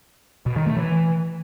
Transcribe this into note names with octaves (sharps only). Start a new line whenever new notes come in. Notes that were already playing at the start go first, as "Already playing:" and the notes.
B2
D#3
A3
E3